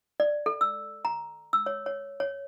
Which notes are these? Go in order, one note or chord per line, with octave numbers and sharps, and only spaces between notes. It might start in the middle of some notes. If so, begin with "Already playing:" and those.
D5
A4
E6
A#5
E6
C#5
C#5
C#5